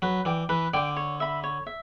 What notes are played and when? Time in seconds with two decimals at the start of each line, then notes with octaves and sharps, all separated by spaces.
0.02 F#3 B4
0.25 E3 D5 G5 D6
0.49 E3 B4
0.73 D3 D5 G5 D6
0.96 C#5
1.20 E5 B5
1.44 C#5
1.66 E5